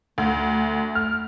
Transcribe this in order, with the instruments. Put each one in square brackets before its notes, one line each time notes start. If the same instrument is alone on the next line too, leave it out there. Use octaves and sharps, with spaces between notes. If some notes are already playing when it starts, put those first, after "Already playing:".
[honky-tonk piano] D2 [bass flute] A3
[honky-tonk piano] F6